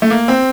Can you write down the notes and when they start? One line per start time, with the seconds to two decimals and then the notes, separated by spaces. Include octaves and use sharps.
0.02 A3
0.10 A#3
0.28 C4